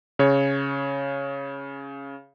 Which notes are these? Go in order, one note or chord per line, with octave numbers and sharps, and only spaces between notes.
C#3 C#5